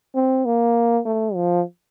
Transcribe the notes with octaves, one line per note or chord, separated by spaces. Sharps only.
C4
A#3
A3
F3